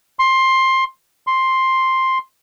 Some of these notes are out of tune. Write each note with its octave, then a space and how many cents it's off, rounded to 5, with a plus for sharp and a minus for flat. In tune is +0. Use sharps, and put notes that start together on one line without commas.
C6 +15
C6 +5